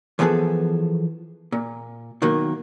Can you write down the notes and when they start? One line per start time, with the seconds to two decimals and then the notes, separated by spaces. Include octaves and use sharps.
0.19 E3 F3 B3 G#4 A4
1.52 A#2
2.22 B2 D#3 F#3 A#3